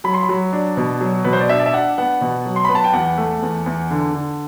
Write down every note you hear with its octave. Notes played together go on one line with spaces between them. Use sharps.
F#3 B5
C6
B5
F#3
D4
B2
F#3
B2 B4
C5
D5
D4 E5
D5
E5
D4 F#5
B3 F#5
B2
F#3
C6
B3 B5
A5
G5
E2 F#5
A3
E2
E2
D3
D3